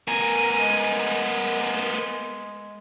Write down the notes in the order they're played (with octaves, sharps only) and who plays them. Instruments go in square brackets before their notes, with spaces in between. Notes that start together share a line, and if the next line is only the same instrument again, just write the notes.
[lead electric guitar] B3 A#4 [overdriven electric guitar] G#5
[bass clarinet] G#3